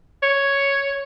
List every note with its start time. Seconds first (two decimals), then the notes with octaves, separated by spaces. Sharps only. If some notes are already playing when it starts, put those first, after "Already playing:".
0.23 C#5